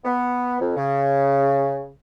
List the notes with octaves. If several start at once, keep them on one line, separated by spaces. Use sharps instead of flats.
B3
F2
C#3